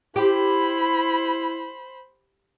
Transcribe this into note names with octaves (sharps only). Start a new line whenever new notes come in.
E4 G4 C5 B5